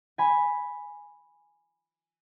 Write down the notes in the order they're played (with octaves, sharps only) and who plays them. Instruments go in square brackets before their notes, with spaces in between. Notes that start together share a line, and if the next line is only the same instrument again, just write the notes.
[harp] G#5 B5